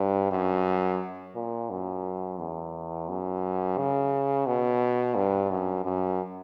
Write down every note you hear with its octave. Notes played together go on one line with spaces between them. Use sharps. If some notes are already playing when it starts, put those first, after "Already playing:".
Already playing: G2
F#2
A#2
F#2
E2
F#2
C#3
B2
G2
F#2
F#2